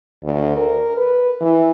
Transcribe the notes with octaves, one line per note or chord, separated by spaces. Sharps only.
D2
A#4
B4
E3